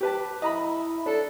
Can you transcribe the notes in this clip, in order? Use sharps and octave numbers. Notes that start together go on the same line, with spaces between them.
G4 B4 A5
E4 D#5 A#5 B5
D4 A4